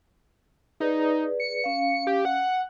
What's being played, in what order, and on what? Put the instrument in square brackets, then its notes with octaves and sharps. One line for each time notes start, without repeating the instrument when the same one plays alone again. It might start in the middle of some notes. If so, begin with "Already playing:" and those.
[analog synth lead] D#4 [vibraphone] G#4 B4 D5
[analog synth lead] C#7
[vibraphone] C#4 F5
[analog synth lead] G4
F#5